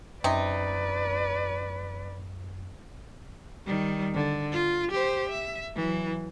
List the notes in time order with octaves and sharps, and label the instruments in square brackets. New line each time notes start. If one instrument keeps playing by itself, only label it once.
[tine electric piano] F#2 [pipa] C3 D#4 [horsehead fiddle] B4 D5
[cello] D#3 G3
D3
F4
G4 C5
E5
E3 F#3